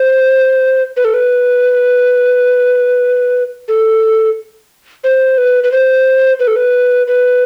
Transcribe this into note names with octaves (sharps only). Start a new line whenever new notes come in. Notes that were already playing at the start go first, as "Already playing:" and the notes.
Already playing: C5
B4
A4
B4
A4
C5
B4
B4
C5
B4
A4
B4
B4